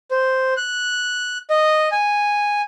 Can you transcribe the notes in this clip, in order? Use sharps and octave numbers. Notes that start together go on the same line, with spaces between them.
C5
F#6
D#5
G#5